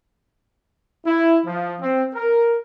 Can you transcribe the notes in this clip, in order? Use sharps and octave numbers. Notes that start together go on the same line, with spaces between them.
E4
F3
C4
A#4